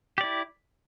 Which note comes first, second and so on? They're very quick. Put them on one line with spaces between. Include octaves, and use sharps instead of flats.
G4 D5 E4